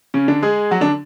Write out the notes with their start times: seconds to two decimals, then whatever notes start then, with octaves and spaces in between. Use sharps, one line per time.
0.14 C#3 C#4
0.28 D3 D4
0.42 G#3 G#4
0.71 F#3 F#4
0.81 D3 D4